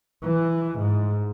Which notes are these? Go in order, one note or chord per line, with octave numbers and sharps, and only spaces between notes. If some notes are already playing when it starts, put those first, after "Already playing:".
E3
G#2